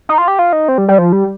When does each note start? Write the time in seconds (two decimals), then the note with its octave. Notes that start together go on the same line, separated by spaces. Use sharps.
0.09 D#4
0.18 F4
0.28 G4
0.39 F4
0.53 D#4
0.68 C4
0.78 G3
0.88 G3
0.98 F3
1.12 G3